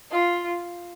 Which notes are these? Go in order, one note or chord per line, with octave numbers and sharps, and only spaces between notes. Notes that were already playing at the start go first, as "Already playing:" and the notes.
F4